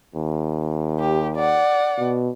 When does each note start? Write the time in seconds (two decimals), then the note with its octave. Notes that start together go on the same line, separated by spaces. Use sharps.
0.15 D#2
0.99 G4
1.36 D5 F#5
1.98 B2